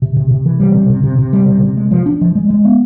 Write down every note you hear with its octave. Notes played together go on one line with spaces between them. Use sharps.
C3
C3
C3
E3
G3
C3
C3
C3
C3
G3
C3
C3
G#3
F3
D4
F3
G#3
G#3
B3